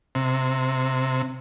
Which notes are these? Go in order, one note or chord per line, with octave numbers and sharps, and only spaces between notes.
C3